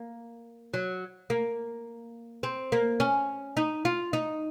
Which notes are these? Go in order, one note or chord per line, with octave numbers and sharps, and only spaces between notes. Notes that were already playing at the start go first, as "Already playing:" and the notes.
Already playing: A#3
F#3
A#3
C4
A#3
C#4
D#4
F4
D#4